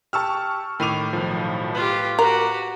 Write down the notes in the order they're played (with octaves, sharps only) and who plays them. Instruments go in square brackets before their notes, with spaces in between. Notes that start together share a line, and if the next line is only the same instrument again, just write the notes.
[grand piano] G4 A5 [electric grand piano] C#6 E6 F6
[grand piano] A2 D#7 F7 [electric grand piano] D#3 D6
[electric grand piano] B1 D#3 F3
[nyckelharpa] F4 G4 [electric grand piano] B4
[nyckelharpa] F#4 G4 [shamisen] A#4